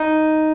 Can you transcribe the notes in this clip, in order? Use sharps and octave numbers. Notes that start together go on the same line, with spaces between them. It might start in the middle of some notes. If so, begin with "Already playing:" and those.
Already playing: D#4